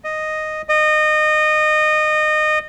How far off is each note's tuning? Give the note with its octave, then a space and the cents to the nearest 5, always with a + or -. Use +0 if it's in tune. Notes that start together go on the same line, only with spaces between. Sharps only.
D#5 -5
D#5 -25